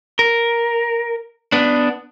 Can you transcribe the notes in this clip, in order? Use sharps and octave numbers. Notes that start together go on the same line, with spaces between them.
A#4
B3 D4